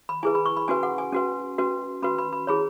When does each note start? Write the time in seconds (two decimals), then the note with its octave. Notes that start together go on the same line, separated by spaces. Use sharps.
0.09 B5
0.23 E4 G#4 B4 G#5
0.35 B5
0.46 C#6
0.57 B5
0.68 C#4 F#4 B4 G#5
0.83 F#5
0.98 G#5
1.13 C#4 F#4 B4
1.58 C#4 F#4 B4
2.02 C#4 F#4 B4 B5
2.18 B5
2.33 B5
2.47 E4 G#4 C#5 B5